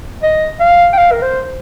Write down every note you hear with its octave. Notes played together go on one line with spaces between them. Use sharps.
D#5
F5
G5
F5
A#4
C5